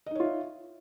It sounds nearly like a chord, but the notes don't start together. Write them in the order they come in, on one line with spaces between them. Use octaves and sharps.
D#5 D#4 C#5 F4 E5